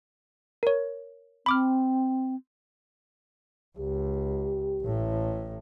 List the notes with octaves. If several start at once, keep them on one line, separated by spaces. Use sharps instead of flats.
A#4 C#5
C4 B5 D6 F6
C#2 G4
A1 A2